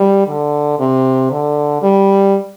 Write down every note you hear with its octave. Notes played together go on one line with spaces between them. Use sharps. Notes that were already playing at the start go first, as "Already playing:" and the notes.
Already playing: G3
D3
C3
D3
G3